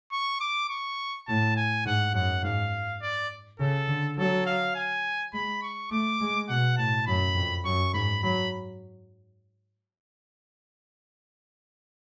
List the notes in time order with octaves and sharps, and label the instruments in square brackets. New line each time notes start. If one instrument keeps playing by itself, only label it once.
[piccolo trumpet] C#6
D6
C#6
[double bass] A2 [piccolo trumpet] A5
[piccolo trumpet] G#5
[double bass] G#2 [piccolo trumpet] F#5
[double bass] F#2 [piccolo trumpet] F#5
[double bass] G#2 [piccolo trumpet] F5
[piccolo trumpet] D5
[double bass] C#3 [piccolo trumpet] A4
[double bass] D3
[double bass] F#3 [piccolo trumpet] A4
[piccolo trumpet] F5
G#5
[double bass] G#3 [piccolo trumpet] B5
[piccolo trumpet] C#6
[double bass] A3 [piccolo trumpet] D6
[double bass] G#3
[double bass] B2 [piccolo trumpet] F#5
[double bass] A2 [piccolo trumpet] A5
[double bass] F#2 [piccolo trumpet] B5
[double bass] F2
[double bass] F#2 [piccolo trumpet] C#6
[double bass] G#2 [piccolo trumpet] B5
[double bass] F#3 [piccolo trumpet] B5